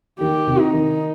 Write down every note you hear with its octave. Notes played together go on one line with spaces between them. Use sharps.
D#3 G4
C3
D#4
D#3